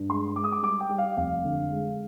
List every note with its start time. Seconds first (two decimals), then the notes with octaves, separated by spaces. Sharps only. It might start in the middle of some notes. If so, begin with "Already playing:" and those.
Already playing: G2
0.09 G#3 C6
0.36 G#3 D6
0.44 D#6
0.52 D6
0.62 G3 D6
0.80 G5
0.89 G3
0.98 F5
1.17 F1 F5
1.44 D3
1.71 G#3